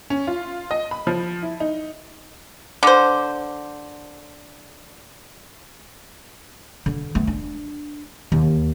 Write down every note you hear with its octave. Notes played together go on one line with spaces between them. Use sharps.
C#4
F4
D#5
B5
F3
E4
D#4
D3 C5
D3
A3 B3
D4
D#2